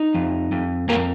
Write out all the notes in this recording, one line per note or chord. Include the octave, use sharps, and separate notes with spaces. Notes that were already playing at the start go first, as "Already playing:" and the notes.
Already playing: D#4
F2
F2
F2 A#3 A#4